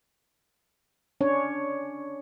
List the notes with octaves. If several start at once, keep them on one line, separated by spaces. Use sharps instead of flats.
C#4 D4 C#5